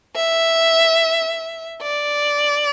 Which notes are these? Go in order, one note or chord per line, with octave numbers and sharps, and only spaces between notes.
E5
D5